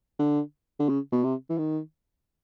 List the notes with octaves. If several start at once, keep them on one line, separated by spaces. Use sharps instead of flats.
D3
D3
C#3
B2
C3
E3
D#3